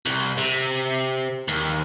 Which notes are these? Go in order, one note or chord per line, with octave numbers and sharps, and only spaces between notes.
C2
C3
D#2